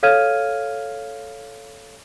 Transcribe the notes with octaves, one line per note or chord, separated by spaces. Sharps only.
A4 C#5 F5 F6 G#6 D#7